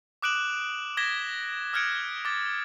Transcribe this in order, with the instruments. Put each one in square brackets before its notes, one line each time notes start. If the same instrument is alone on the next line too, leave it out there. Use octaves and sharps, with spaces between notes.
[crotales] D6 D#6 F#6 D7 E7 F#7
D6 G#6 A#6 B6 E7 G7
D#6 F6 F#6 G#6 C#7 D7
D6 A6